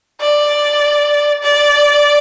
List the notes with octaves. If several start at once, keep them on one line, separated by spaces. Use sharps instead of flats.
D5
D5